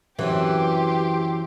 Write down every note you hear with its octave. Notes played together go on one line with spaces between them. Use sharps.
F#2 C3 E3 F#3 G4 C6